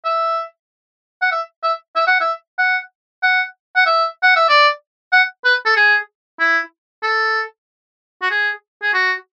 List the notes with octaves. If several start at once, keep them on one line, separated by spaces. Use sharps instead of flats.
E5
F#5
E5
E5
E5
F#5
E5
F#5
F#5
F#5
E5
F#5
E5
D5
F#5
B4
A4
G#4
E4
A4
F#4
G#4
G#4
F#4